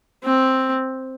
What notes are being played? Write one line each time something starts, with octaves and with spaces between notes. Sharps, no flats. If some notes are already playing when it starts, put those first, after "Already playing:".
C4